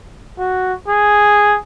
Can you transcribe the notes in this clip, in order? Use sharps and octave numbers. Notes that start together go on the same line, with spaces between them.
F#4
G#4